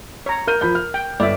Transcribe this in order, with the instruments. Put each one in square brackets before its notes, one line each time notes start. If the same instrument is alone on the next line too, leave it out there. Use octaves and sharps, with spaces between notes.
[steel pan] C#5 A#5
[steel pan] A#4 [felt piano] F6 G6 D#7
[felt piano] F3 B5 G6
F6
[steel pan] G5
[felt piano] G1 [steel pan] D5 E5